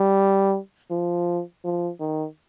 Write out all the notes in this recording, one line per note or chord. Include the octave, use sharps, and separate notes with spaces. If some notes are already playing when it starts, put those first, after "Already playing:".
Already playing: G3
F3
F3
D#3